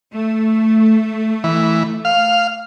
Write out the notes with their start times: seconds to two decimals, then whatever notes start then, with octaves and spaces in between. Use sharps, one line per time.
0.13 A3
1.44 E3
2.05 F5